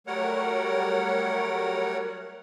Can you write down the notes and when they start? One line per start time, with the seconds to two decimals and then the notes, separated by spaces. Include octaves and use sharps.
0.07 F#3 G3 A3 A#4 C#5 F#5